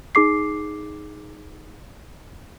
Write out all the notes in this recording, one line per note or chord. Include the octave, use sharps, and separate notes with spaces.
D#4 G#4 D6 C7